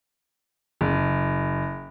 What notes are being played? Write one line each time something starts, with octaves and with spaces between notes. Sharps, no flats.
F#1